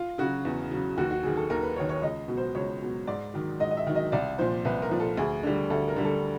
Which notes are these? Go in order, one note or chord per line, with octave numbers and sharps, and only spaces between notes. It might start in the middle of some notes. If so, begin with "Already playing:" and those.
Already playing: F4
C#3 F#3 F#4
E2
C#3 F#3
D#2 F#4
F#4
D#3 F#3 G#4
A4
D#2 A#4
B4
D#3 F#3 C#5
C#5
C#2 D#5
B2 F#3
C5
C#2 C#5
B2 F#3
G#2 D5
D#3 F#3
G#2 D#5
D#5
E5
D#3 F#3
D#5
C2 D5
A#2 F3 C5
C2 B4
A#4
A#2 F3
A4
D2 G#4
D3 G3
D2 A4
A#4
D3 G3
A4